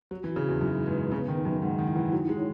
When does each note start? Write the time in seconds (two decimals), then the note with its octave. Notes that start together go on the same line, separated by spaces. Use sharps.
0.11 F#3 F#4
0.24 E3
0.35 C#3 F#4
0.49 E2
0.61 F#2 D#4
0.86 G#2 B4
1.11 C#3 B3
1.28 D#3
1.37 D#4
1.45 F#2
1.62 G#2 F#5
1.79 D#3
1.87 E4
1.96 E3
2.12 F#3 D#4
2.29 G#3
2.37 C#5